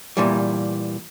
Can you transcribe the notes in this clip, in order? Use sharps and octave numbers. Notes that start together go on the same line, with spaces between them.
A#2 E3 G3